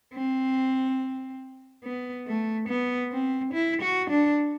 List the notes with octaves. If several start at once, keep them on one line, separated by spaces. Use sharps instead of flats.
C4
B3
A3
B3
C4
E4
F#4
D4